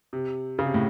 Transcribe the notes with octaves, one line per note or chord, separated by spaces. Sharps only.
C3
C#3
C3
A2